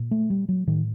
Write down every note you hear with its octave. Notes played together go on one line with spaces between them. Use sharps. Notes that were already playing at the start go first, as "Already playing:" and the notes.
Already playing: A#2
A3
G3
F#3
A2 D#3